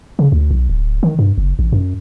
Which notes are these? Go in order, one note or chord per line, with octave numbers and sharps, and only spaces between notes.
C#3
D2
B1
D1
D#3
G2
F#1
A1
F#2